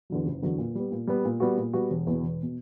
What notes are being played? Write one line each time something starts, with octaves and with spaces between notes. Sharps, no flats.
E2 D3 F#3
F#1
E2 D3 F#3
A#2
G3 B3
A#2
G3 B3
A#2
G3 B3 F#4
A#2
G3 B3 F#4
E1
E2 B2
E1
B2